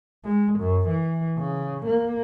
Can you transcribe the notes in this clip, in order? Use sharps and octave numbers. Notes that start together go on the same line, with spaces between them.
G#3
F#2
E3
C#3
A#3